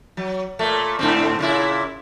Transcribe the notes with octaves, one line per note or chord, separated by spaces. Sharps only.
F#3
A#2 A3
G#2 D3 C4
A#2 C#3 E4